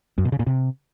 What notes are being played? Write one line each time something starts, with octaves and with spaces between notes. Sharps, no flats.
F#2
B2
C#3
A#2
C3